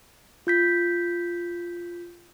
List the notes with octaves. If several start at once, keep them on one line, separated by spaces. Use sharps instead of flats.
F4 G6 B6